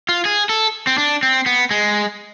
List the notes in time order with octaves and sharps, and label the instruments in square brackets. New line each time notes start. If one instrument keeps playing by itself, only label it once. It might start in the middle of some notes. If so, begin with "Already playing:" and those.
[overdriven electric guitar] F4
G#4
A4
C4
D4
C4
B3
G#3